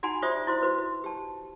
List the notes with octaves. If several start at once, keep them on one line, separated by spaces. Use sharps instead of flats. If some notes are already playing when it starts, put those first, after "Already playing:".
D#4 F#4 F#5 G#5 A#5 B5
F4 G4 C5 D5 E5 D#6
E4 F#4 C5 C6
F#4 B4 C5
G4 A5